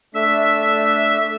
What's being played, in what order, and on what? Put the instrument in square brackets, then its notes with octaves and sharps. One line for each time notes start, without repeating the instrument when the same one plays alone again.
[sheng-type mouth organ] A3 D4 [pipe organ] E5